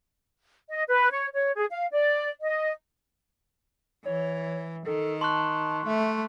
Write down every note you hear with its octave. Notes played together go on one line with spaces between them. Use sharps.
D#5
B4
C#5
C#5
G#4
F5
D5
D#5
E3 C#5
D#3 A4
A5 C6 C#6 F#6
A3 E5